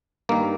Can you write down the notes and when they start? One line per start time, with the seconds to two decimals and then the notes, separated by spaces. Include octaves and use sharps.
0.29 G2 D#3 A#3